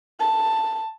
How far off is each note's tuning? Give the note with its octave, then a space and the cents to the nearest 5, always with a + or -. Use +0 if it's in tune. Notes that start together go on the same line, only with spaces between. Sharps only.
A5 +5